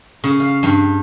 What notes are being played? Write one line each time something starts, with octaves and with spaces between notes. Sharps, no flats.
C#3
F5
G2